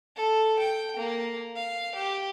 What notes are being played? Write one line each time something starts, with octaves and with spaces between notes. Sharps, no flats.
A4
G5
A#3
F5
G4